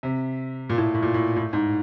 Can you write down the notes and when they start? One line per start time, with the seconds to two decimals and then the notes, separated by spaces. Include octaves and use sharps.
0.03 C3
0.69 A#2
0.78 A2
0.94 A2
1.02 A#2
1.14 A2
1.36 A2
1.53 G#2